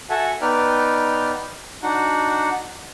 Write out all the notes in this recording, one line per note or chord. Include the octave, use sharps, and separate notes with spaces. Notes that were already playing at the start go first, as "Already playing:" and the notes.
F#4 A4 E5 F#5 G#5 A5
B3 D#4 B4 D5 G5 F6
D4 D#4 F#4 F#5